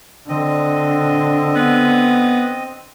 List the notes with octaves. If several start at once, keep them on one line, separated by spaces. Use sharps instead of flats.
D3 C4 D#5
B3